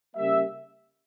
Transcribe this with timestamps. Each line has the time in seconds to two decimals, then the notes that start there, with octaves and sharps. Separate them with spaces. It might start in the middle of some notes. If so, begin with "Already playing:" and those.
0.16 C#3 G3 A#3 E5